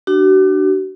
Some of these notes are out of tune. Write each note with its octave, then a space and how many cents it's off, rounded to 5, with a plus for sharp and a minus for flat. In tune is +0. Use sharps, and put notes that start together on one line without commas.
D4 +20 F#4 +40